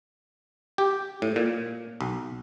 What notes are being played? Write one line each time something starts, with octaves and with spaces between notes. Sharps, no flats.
G4
A2
A#2
B1